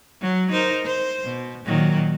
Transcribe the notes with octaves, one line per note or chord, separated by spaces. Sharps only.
F#3
D#4 A#4 C5
C5
B2
A#2 D#3 F#3